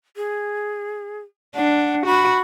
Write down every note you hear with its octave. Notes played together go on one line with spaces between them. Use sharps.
G#4
D4 F#5
F#4 B5